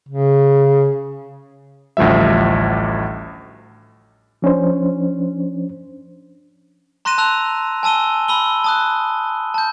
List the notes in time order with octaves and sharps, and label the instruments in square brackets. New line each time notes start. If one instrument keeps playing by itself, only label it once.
[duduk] C#3
[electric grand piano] A1 D2 F3 G3 E5
[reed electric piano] F3 C#4 D4 C5
[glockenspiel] A#5 C6 F#6 A#6 D#7 E7
A5 E6 F#6 F7
G#5 A5 E6 D#7 G7
B5 E6 D#7 G7
A5 D#6 F#6
A5 G6